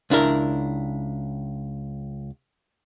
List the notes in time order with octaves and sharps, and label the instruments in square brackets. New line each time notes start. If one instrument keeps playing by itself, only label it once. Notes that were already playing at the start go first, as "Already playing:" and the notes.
[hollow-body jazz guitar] C#2 D4 E4 A#4